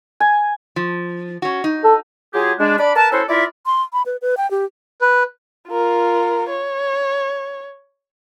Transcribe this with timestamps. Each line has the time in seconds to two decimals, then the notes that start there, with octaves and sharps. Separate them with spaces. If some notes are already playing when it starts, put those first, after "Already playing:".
0.20 G#5
0.76 F3
1.42 C#4 F#4
1.64 D#4
1.84 A4
2.33 F#3 F4 G4 G#4
2.58 G#3 D4
2.78 D4 D5 B5
2.96 A#4 B4 A5
3.12 C#4 E4 F#4 A4 C5
3.29 E4 F4 A#4 D5 E5
3.66 C6
3.93 B5
4.06 B4
4.22 B4
4.37 G5
4.51 G4
5.01 B4
5.68 F4 A#4
6.50 C#5